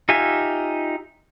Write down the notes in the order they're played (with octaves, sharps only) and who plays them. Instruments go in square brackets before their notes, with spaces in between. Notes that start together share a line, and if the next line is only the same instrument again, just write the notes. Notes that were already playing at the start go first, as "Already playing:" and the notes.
[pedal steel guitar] D#4 F4 G4 E5 G#5